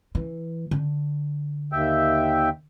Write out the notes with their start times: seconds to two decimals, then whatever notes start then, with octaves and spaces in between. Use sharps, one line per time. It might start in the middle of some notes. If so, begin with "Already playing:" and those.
0.15 E3
0.71 D3
1.72 D#2 E5 G5